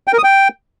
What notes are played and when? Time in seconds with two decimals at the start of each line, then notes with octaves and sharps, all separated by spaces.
0.07 G5
0.13 A#4
0.18 D#6
0.24 G5